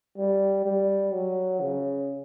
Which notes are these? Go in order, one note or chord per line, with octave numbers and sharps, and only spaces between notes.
G3
G3
F#3
C#3